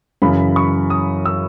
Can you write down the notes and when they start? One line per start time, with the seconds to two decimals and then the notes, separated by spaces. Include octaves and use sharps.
0.22 F#2 C#3 E3 B5
0.56 C#6
0.90 D#6
1.25 E6